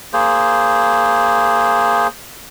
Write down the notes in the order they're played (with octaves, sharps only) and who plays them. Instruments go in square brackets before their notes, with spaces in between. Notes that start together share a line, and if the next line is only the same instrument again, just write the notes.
[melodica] A#3 G#4 C5